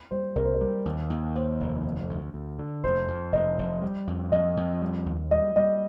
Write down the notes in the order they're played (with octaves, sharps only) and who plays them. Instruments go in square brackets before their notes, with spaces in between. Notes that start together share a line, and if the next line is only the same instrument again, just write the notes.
[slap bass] G3 [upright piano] C5
[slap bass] C2 [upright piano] A#4
[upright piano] C5
A#4
[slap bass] G3
D#2
D#2
[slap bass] D#2 [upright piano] C5
[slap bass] F1
D2
D2
D2
D3
[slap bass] F1 [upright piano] C5
[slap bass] F2
[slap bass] F1 [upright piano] D#5
[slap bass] F1
G3
F2
[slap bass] F2 [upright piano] D#5
[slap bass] F2
G3
D#2
[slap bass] G3 [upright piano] D#5
[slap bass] G3 [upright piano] D#5